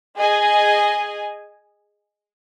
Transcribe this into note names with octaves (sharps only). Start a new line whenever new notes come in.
G#4 D#5 G#5